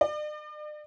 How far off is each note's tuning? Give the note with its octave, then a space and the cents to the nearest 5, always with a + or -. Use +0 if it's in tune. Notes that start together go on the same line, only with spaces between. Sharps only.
D5 +45